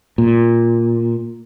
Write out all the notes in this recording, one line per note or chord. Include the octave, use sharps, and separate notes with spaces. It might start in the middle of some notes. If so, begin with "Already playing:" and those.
A#2